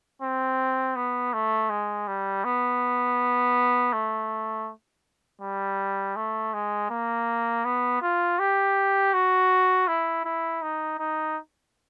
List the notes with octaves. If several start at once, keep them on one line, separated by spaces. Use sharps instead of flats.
C4
B3
A3
G#3
G3
B3
A3
G3
A3
G#3
A#3
B3
F4
G4
F#4
E4
E4
D#4
D#4